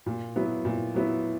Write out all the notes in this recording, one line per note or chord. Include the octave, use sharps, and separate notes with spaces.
A#2
F#3 B3 E4
A#2
F#3 B3 E4